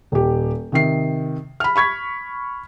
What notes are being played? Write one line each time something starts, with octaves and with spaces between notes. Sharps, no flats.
D#1 G4
C3 D#3 C7
B5 F6
B5 C#6 G#6 B6